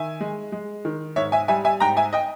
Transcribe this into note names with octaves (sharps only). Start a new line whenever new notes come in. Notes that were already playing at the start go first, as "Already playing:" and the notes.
Already playing: D#3 E5 G#5
G#3
G#3
D#3
G#2 C#5 E5
E5 G#5
G3 E5 G#5
E5 G#5
G#2 G5 A#5
E5 G#5
D#5 G5